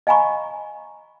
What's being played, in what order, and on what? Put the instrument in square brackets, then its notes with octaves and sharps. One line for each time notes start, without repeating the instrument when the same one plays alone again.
[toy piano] D#5 F5 G#5 A#5 B5 C#6